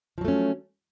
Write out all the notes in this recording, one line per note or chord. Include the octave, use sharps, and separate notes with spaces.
F3 F#3 A3 C#4